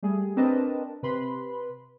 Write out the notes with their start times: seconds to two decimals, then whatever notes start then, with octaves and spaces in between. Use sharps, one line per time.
0.03 G3 A3 G#4
0.37 C4 D4 A#4 B4 D#5 A5
1.03 C3 B4 B5 C6